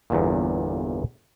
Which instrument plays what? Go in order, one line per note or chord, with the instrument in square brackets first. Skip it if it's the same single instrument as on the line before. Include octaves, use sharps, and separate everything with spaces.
[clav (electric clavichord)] G1 E2 A#2